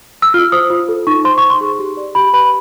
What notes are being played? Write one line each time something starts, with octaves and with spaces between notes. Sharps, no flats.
E6
F4 F6
C5 D#6
F4
A4
D#4 C#6
C5 C6
C#6
D#4
C6
G#4
G4
D5
G4 B5
B4 B5